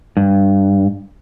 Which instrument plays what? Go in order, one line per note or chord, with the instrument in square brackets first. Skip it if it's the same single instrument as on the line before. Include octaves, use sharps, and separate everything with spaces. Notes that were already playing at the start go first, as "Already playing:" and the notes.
[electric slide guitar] G2